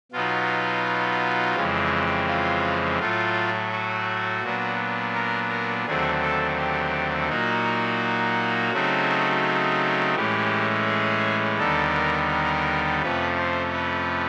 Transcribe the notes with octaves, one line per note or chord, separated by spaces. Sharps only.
B2 F#3 B3 D#4 F4
F2 C#3 E3 G#3 C4
F4
A2 F#3 A3 F4
F#4
A#2 F#3 B3 D4
A#4
A#4
D#2 D3 F#3 A3 C4 G#4
A4
G4
A#2 F#3 A#3 D#4 F#4
C#3 F#3 A3 C4 D#4
A2 E3 G#3 C#4 G4
G#4
D#2 D3 G3 B3 D#4 A4
A#4
A#4
F2 C3 F3 A3 C#4 B4
C5
B4